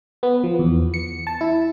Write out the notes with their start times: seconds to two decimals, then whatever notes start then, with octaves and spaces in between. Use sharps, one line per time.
0.23 B3
0.44 F3
0.59 E2
0.94 C#7
1.27 A5
1.41 E4